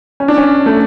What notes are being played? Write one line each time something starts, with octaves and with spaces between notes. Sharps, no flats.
C#4
D4
C#4
A3